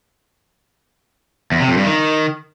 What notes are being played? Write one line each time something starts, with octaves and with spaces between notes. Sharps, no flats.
E2
C3
F2
G2
D#3